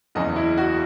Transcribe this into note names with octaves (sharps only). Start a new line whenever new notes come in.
F#1 E2 C#3 D#5
E4
F#4